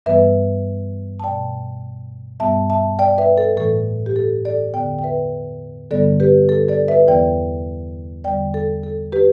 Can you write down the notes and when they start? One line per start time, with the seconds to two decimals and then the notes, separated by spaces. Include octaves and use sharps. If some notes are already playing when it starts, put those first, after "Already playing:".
0.06 G2 E3 G3 B3 B4 E5
1.20 A5
1.24 B2 A3 D5 G5
2.40 G2 G3 B3 E5 A5
2.70 E5 A5
2.99 D5 G5
3.18 B4 E5
3.37 A4
3.57 A2 E3 A3 A4
4.06 G4
4.16 A4
4.45 A4 D5
4.74 E2 D3 B3 D5 G5
4.99 G5
5.03 B4 E5
5.91 G2 D3 G3 B3 A4 D5
6.20 G4 B4
6.49 A4
6.68 A4 D5
6.88 B4 E5
7.07 E2 E3 B3 D5 G5
8.24 E2 D3 G3 B3 D5 G5
8.54 A4
8.83 A4
9.12 G4 B4